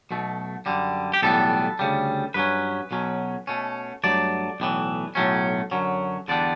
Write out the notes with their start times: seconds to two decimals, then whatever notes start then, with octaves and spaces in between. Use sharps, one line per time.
0.11 B1 B2 A3
0.66 F#2 D3 G3
1.14 G4
1.22 B1 A2 E3 G3 B3 A4
1.79 D2 C#3 G3
2.34 G2 F#3 C#4 B4
2.91 B1 B2 F#3 C#4
3.47 B2 A3 C#4
4.04 G2 F#3 A3 D5
4.60 B1 A2 E3
5.15 B1 A2 F#3 A3 C#4
5.71 F#2 D3 F#3 C#4
6.28 E2 D3 G3 B3 D4 D5